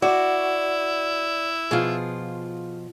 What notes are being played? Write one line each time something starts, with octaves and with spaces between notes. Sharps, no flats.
E4 F#4 D5
B2 F3 F4 G#4